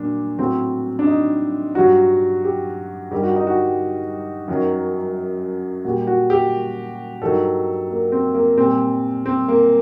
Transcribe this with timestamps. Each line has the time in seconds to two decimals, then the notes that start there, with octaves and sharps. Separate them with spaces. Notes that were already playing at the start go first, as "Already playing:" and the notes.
Already playing: A#2 F#3 D4
0.38 A2 F#3 C4
0.99 D4
1.07 D#4
1.75 G2 F#3 F#4
2.44 G4
3.11 G2 D#3 G3 G4
3.23 F#4
3.36 D#4
3.47 F#4
4.48 F#2 D#3 F#3
5.85 A#2 G3 F#4
6.07 F#4
6.30 G4
7.21 G2 D#3 F#3 A4
7.90 A#3
8.12 C4
8.34 A#3
8.58 A#2 G3 C4
9.26 C4
9.48 A#3